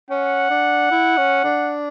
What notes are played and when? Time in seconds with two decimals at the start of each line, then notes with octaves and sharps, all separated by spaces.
0.10 C#4 F#5
0.50 D4
0.91 E4
1.17 C#4
1.44 D4